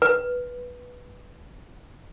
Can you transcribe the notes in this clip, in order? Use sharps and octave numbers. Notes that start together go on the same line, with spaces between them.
B4